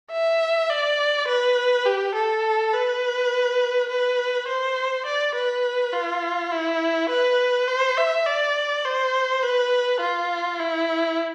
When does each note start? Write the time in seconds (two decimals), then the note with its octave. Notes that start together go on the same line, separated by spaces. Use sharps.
0.12 E5
0.70 D5
1.28 B4
1.86 G4
2.15 A4
2.73 B4
3.90 B4
4.48 C5
5.06 D5
5.35 B4
5.93 F4
6.52 E4
7.10 B4
7.68 C5
7.97 E5
8.26 D5
8.85 C5
9.43 B4
10.01 F4
10.60 E4